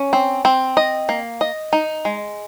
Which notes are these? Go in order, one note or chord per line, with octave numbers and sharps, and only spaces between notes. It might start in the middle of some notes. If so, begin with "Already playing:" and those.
Already playing: C#4
C4
C4
D#5
A#3
D#5
D#4
G#3